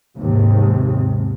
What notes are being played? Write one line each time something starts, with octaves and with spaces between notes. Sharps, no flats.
D#2 G#2 C3